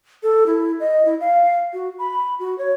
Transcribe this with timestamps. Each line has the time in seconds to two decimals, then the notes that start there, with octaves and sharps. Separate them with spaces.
0.23 A4
0.47 E4
0.80 D#5
1.05 E4
1.21 F5
1.73 F#4
1.99 B5
2.39 F#4
2.58 C#5